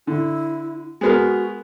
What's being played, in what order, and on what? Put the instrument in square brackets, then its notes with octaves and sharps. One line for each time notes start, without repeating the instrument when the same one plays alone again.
[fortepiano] D3 [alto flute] E4
[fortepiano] G#3 B3 A#4 [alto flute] F#4